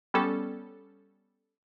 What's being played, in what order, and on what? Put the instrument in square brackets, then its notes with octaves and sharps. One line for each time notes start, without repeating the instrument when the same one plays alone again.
[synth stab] G3 B3 C#4 A4